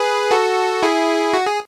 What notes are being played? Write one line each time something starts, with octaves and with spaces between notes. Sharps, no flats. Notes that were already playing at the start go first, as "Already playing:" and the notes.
Already playing: G#4 B4
F#4 A4
E4 G#4
F#4
G#4